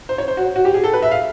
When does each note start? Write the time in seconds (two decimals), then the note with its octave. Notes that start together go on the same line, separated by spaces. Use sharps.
0.09 C5
0.18 C#5
0.28 C5
0.37 F#4
0.56 F#4
0.65 G4
0.74 G#4
0.84 A4
0.93 B4
1.02 E5
1.11 F5